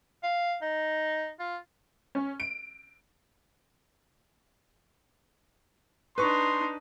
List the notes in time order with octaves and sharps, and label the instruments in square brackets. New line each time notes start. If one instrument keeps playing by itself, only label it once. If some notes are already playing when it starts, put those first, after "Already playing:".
[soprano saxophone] F5
D#4
F4
[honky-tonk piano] C#4
D7
[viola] D4 D#4 [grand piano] B4 C#6 [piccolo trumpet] C6